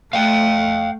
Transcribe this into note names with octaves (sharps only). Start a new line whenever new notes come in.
A3 F5 G5